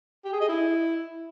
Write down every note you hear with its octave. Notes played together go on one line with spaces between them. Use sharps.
G4
G#4
D#5
E4